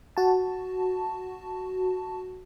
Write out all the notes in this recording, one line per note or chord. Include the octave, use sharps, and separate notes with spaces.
F#4 A5